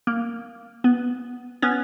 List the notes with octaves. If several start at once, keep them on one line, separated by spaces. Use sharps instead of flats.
A#3
B3
B3 C#4